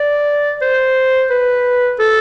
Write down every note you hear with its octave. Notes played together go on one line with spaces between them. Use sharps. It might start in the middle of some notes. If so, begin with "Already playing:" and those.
Already playing: D5
C5
B4
A4